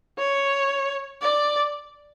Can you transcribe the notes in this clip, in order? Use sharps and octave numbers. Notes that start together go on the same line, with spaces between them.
C#5
D5